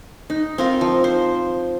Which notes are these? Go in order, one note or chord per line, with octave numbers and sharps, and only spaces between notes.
D#4
C4 F4 A#4
F3
C5